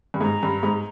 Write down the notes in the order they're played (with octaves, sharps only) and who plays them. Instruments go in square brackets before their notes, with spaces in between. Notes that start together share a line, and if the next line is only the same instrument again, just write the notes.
[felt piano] G2
[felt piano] G#2 [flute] A#5
[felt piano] G2
G#2